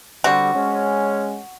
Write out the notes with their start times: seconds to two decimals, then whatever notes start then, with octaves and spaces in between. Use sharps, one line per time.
0.24 D3 G3 C4 F#4
0.54 G#3 C#4